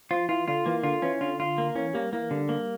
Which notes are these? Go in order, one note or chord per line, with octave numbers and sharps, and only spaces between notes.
F3 F4
E3 F4
D3 F4
E3 A#3
D3 F4
E3 C#4
D3 F4
F4
A#3
E3 C#4
G3 A#3
E3 A#3
D3 G3
A#3